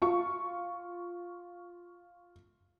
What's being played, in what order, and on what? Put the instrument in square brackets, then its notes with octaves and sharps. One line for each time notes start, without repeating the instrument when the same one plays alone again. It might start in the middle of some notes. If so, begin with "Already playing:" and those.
[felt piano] F4 C#6